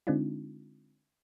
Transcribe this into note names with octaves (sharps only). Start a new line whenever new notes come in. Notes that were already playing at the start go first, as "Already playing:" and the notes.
D3 G#3 C4 D4 D#4 F4